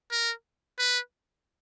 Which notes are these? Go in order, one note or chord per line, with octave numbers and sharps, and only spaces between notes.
A#4
B4